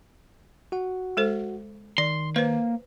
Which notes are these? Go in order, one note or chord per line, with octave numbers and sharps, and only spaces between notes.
F#4 F#5
G#3 A4 C5
D#3 D5 C6
A#3 B4 C5